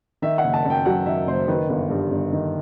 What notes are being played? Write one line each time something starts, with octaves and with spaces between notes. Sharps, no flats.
D#3 E5
F#5
F#1
A5
F#2
G5
F#3 F#5
D#3 E5
F#1 C5
D#3 B4
G1
G2
G1
D#3